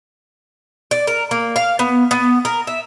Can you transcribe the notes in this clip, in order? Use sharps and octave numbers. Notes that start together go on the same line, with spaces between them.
D5
A#4
A#3
F5
B3
B3
A#4
E5